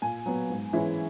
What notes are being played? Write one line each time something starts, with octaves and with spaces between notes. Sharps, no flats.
A#2 G#5
F#3 B3
G#2
E3 G#3 C#4 E4